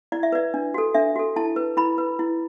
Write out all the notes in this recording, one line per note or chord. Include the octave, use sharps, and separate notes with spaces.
E4 D5
E5
B4 D5
D4
F#4 A4
D4 E5
F#4 A4
E4 A5
B4
E4 B5
B4
E4